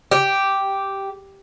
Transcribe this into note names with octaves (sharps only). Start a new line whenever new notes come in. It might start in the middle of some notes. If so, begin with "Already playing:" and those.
G4